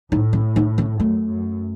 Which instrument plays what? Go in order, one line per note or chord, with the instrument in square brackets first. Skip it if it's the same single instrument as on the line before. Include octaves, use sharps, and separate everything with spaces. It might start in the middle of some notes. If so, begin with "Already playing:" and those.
[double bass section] A2 [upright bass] D#4
[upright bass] C#4
D#4
C#4
[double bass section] F#2 [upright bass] A3
[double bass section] F#2